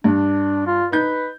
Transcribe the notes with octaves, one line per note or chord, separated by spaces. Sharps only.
G2 D4
F4
D#4 B4 G6